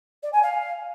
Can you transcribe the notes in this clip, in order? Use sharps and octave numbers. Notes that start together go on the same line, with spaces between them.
D5
G#5
F5